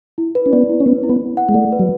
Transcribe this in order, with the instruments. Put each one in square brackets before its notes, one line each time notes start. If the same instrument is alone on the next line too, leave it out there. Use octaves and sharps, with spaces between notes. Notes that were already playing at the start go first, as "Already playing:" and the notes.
[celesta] E4
B4
[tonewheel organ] C#4
[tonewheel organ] B3 [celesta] D5
[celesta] E4
[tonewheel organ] C#4
[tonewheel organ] B3 [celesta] B4
[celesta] E4
[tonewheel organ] B3
[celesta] E4
F#5
[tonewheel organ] G#3
[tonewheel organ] A3 [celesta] D5
[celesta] B4
[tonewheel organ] F#3